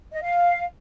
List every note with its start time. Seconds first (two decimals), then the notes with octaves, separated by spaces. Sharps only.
0.13 D#5
0.21 F5